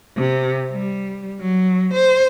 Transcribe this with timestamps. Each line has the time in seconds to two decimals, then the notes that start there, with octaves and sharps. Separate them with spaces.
0.17 C3
0.71 G3
1.41 F#3
1.94 C5